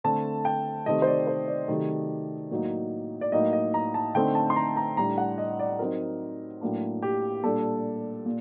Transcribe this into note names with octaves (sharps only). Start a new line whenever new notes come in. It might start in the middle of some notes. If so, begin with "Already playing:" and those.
D3 A3 C4 A5
G5
C3 D#3 A3 C4 D#5
C5
D5
C5
D5
C3 D#3 F#3 A3
A2 F#3 A#3 D#4
D5
A2 F#3 A#3 D#4 D#5
D#5
A#5
A5
D3 A3 C4 D#4 G5
A5
C6
A#5
A#5
A2 G3 D4 A#5
F#5
D#5
D5
F#3 C4 D#4 A#4
A2 F#3 A#3 D4
G4
A#2 G3 D4 A4
A#2